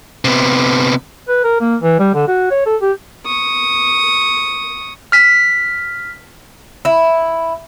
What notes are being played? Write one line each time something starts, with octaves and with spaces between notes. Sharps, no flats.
C3 B3
B4
A#4
A#3
E3
G3
D3
F#4
C#5
A4
G4
C#6 D#6
F6 B6
E4